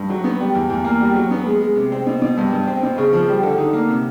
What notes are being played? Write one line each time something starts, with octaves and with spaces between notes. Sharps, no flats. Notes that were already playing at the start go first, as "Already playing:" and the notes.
Already playing: G2
F#3
B3
G3
E2
E2
A#3
G3
F#3
B3
G#3
G#3
C3
C4
B2
B2
G2
G2
C4
B2
C#3
F3
G3
D3
D#4
A#3
C3